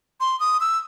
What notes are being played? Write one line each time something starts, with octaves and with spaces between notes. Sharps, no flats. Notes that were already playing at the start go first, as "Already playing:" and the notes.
C6
D#6
E6